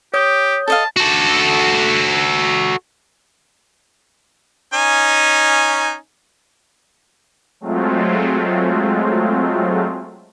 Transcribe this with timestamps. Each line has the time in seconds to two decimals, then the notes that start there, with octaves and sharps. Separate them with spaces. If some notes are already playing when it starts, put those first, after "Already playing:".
0.14 G4 C#5 D#6 G6
0.68 A4 D#5 F5 A5
0.96 F#4 A4
4.73 C#4 D#4 G#5
7.60 F#3 G#3 A3 C4 F4